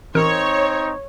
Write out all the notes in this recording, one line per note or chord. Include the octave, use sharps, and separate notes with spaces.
A1 C4 D#4 A#4 C#5